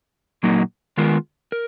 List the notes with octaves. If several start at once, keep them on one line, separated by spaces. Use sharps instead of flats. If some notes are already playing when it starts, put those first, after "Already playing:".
A#2 F#3 A#3 D#4
D#3 G#3 B3 F4 A#4
A#4